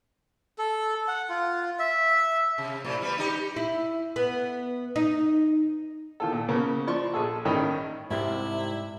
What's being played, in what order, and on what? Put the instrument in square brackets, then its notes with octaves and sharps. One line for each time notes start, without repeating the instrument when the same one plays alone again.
[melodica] A4
F#5
F4
E5
[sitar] C3
A2 C3
G3 B4
D#4 G4
[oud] E4
B3
D#4
[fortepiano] D#3 F4 A4
A#2
C#3 A#3 B3
F3 D5 C6 C#6
A#1 G#4 A4
A1 G2 D#3 C#4 D#5 B5
[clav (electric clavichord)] C2 [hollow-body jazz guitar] G#2 G4 C6 [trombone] C3 [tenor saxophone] E4